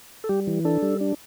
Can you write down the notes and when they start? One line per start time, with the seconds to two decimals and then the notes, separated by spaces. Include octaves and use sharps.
0.24 A4
0.29 G3 G4
0.47 E3
0.65 D4 A4
0.82 G3
1.01 D4